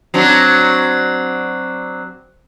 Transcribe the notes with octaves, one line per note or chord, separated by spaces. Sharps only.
F#3 C4 D4